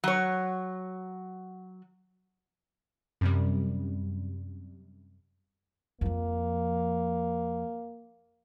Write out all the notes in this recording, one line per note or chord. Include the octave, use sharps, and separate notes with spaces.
F#3 C#5
F#2 C3 G3
F2 F3 A#3